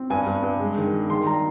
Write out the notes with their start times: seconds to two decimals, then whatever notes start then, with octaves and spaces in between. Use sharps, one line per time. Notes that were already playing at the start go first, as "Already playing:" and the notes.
Already playing: C4
0.10 G2 G#5
0.26 G2
0.43 G2
0.60 G#3
0.77 D#3
0.93 G#3
1.10 D#3 C6
1.27 G3 A#5